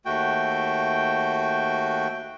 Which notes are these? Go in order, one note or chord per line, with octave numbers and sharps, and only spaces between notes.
D#2 A3 F#4 G5